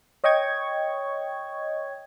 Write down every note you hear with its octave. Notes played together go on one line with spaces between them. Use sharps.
C#5 D#5 G5 C#6 G#6